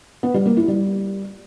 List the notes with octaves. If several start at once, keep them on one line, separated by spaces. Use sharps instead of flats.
B3
G3
A#3
E4
G3